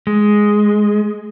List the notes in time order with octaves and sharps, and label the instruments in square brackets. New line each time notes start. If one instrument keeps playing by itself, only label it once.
[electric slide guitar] G#3